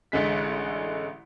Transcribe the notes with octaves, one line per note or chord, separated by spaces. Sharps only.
A1 D3 G#3 B6